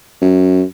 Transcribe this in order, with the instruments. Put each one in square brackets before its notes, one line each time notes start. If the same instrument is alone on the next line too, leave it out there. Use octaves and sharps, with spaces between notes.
[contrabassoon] F#2